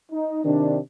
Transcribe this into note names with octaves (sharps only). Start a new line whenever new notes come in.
D#4
C3 D#3 D4